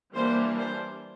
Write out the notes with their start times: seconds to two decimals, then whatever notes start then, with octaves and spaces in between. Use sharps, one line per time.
0.14 E3 G3 A#3 D4 C5
0.57 C5